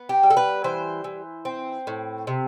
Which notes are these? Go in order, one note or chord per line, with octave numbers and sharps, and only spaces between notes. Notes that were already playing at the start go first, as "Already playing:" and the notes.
Already playing: B3
G4
G3
A4
B4
E3 C5
E3
C4
A2
C3